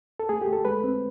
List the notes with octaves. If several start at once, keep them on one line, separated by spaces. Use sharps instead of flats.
A4
A3 G#4
G4
A3
A4
G#3 B4
C4